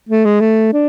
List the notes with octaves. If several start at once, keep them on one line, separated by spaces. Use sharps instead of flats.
A3
G#3
A3
D4